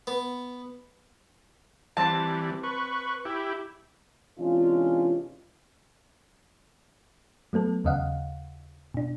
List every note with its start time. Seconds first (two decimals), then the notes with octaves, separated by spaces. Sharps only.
0.07 B3
1.97 E3 G3 C4 A5
2.63 B4 C#6
3.25 E4 G4
4.38 C3 E3 G#3 C#4 D4 F4
7.53 F#3 A3 B3 A4
7.85 D#2 C#3 D#5 F5 F#5
8.94 B2 D4